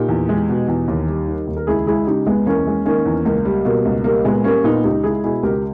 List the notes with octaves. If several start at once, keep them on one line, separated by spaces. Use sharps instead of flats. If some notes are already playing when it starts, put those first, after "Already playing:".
Already playing: A#2 D#4 G4
E2
G#3
B2
E2
D#2
G3
D#3
D#2
A#4
C#2 E4 G#4
G#3 E4 G#4
C#3 D#4 G4
C#2 G#3 B3
E2 A#3 C#4
G#3
D#3 A#3 C#4
E2
C#2 A#3
G3
B2 A#3
C#2
G3 A#3
A#2 G#3 B3
G3 A#3 C#4
A#2 B3 D#4
C#2 D#4 G4
G#3 E4 G#4
B2 E4 G#4
C#2 G4 A#4